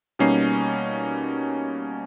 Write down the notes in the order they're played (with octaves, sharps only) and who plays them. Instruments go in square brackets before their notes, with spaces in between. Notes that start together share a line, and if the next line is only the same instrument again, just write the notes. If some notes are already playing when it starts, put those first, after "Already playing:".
[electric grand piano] B2 G3 A#3 C#4 D#4 C7